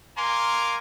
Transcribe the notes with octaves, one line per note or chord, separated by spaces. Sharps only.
A#4 F5 G#5 A#5 C6 D6